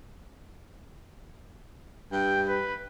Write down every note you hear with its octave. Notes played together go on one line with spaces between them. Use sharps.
G2 G5
B4